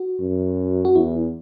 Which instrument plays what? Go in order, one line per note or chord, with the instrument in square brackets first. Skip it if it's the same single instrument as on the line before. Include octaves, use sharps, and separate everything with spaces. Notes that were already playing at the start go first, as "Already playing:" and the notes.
Already playing: [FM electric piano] F#4
[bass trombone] F#2
[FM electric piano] F#4
[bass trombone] E2 [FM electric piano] E4